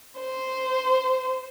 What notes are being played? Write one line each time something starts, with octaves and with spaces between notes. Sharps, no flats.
C5